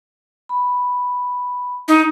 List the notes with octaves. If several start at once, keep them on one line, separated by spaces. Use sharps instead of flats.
B5
D#4